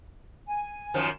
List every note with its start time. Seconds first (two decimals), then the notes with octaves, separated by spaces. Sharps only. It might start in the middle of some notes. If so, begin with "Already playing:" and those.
0.47 G#5
0.94 F#2 D#3 F3